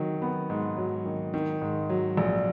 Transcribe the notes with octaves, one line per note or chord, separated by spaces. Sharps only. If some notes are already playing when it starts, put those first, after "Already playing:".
Already playing: D#3 F#3
B3
G#2
F#3
D#3
D#3
G#2
F#3
A#1